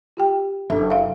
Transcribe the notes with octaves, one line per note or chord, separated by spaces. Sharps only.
F4 G4 G5
F#1 D4 A4 E5
E5 F5